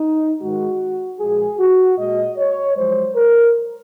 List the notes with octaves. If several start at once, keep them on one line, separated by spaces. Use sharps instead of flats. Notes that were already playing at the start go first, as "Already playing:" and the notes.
Already playing: D#4
G#2 D#3 G#3 F#4
A#2 F3 G#3 G#4
F#4
A#2 G#3 D#5
C#5
F#2 F3 G#3 C5
A#4